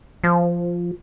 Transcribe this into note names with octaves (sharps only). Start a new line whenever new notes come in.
F3